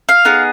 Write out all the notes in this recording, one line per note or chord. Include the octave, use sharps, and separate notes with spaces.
F5
B3 D#4 G#4